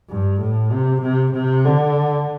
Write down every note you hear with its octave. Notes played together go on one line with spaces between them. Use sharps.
G2
A2
C3
C3
C3
D3